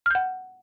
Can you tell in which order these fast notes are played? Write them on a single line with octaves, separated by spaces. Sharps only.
F6 G6 F#5